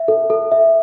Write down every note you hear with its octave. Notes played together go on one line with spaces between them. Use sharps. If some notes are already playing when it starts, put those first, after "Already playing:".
Already playing: E5
A4
A4
E5